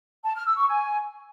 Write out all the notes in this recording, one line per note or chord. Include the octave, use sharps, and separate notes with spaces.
A5
F6
E6
C#6
G#5